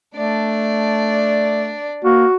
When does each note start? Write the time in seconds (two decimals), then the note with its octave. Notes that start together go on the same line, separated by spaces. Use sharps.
0.15 A3 D4 D5
2.05 A#3 F#4